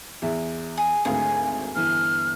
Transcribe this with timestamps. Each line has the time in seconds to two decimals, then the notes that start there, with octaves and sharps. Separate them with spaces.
0.22 E2 E5
0.77 G#4
1.05 G#1 D2 G#4 F5
1.76 G1 E3 F6